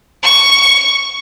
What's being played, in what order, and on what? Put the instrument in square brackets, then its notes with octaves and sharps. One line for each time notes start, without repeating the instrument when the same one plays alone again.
[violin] C#6